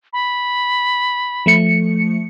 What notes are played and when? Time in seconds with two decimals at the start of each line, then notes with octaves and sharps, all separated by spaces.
0.13 B5
1.46 F3 A3 C#7